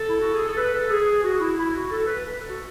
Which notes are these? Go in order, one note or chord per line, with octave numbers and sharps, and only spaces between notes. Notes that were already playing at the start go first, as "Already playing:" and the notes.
Already playing: A4
E4
F#4
G#4
A4
B4
A4
G#4
F#4
E4
E4
F#4
A4
B4
B4
A4
F#4